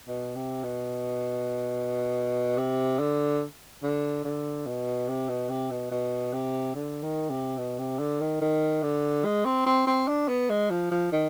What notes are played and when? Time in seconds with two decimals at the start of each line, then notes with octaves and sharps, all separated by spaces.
0.08 B2
0.36 C3
0.64 B2
2.58 C3
2.99 D3
3.83 D3
4.25 D3
4.66 B2
5.08 C3
5.29 B2
5.49 C3
5.71 B2
5.91 B2
6.33 C3
6.75 D3
7.03 D#3
7.30 C3
7.58 B2
7.79 C3
7.99 D3
8.21 D#3
8.41 D#3
8.83 D3
9.25 G#3
9.45 C4
9.66 C4
9.87 C4
10.08 D4
10.28 B3
10.50 G#3
10.70 F3
10.91 F3
11.12 D#3